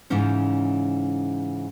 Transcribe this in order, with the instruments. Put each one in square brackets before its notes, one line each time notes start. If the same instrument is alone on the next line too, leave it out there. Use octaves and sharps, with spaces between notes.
[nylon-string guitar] G#2 C#3 E3 C#4 D#4